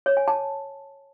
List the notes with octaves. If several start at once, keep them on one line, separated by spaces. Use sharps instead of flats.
C#5
G#5
A5